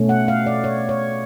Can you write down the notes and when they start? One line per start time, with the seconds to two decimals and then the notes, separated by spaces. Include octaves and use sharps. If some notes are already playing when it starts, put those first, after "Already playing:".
Already playing: B2 A3 C#4
0.09 F#5
0.28 F5
0.46 D5
0.64 C#5
0.89 C#5